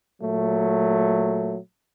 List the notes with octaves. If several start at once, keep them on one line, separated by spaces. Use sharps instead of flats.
A#2 F#3 A3